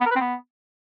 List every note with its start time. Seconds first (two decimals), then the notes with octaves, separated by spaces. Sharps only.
0.01 B3
0.06 A#4
0.11 B4
0.16 C4
0.21 B3